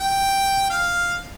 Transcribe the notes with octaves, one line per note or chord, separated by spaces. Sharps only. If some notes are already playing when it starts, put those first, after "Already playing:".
G5
F5